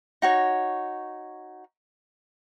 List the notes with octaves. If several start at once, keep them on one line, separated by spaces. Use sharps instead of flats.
D#4 F#4 C#5